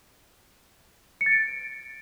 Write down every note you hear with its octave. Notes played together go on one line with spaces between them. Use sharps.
C#7
A6
D7